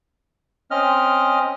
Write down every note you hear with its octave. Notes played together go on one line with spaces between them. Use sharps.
C4 C#4 D#5 F6